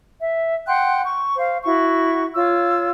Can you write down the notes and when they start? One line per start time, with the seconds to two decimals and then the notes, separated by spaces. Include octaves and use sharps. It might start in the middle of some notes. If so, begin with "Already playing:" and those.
0.20 E5
0.67 F#5 G5 C6 F#6
1.06 C#6
1.37 C5 F5
1.64 E4 F#4 C#6
2.35 F4 C#5 E6